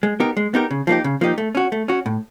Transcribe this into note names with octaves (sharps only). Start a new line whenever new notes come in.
G#3
B3 D#4 G4 A#4
G#3
B3 D#4 G4 A#4
C#3
F3 A#3 D#4 G4
C#3
F3 A#3 D#4 G4
A3
C#4 F#4
A3
C#4 F#4
A2